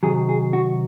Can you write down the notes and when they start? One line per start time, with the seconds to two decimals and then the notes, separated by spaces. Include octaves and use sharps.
0.03 C3 D#3 F#3 G#4
0.29 G#4
0.53 F#4